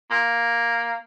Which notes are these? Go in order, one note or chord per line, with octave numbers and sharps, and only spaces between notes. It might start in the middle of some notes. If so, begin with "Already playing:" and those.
A#3